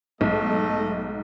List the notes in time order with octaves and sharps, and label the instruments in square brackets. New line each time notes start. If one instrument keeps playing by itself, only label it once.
[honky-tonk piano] B1 G#2 [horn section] A3 D#5